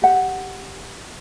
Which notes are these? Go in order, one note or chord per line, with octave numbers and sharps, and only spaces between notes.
G4 F#5